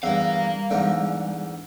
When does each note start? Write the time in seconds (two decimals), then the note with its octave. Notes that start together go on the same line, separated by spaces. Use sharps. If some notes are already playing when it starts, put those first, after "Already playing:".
0.03 E2 G2 G3 A#4 F5
0.71 E2 G#2 D3